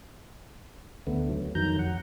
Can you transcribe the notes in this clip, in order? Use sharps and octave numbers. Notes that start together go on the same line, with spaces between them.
D2 D3 A3 B3
F#3
F2 D#3 F#3 A#5 G6
F2 F#5